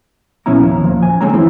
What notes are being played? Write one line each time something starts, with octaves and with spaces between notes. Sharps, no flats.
A#2 F3 B3 C#4 E4 A#5
D#2
F3 A#3
G#5
D3 G#3 A#3 C4 C#5 A#5
E3 F3 C4 E4